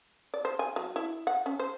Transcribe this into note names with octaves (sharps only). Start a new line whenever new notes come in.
D5
C5
G#5
F#3
E4
F#5
C#4
C5